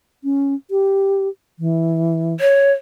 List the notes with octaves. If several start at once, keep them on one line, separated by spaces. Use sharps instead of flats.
C#4
G4
E3
C#5